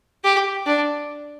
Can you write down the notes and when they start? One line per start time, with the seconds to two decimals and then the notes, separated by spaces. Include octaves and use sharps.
0.24 G4
0.67 D4